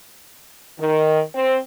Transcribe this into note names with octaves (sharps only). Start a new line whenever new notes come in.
D#3
C4